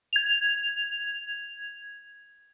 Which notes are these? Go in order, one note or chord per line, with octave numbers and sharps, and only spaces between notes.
G#6 F7